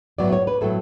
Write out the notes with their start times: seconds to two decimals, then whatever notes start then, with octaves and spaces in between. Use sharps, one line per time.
0.18 A2 F#3 B3 D5
0.33 C#5
0.47 B4
0.61 A2 F#3 B3 A4